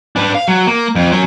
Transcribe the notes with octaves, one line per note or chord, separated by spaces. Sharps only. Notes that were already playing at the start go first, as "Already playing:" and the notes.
D4 B4
F5
F#3
A#3
F2
F#3 C#4